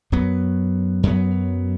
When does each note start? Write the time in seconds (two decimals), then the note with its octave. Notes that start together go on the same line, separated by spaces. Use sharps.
0.12 F#2 F#3 B3
1.03 F#2 F#3 B3